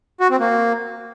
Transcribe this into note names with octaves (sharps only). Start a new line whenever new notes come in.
F#4
C4
A#3